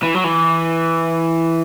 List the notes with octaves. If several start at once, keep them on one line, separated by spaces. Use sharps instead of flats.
E3
F#3
E3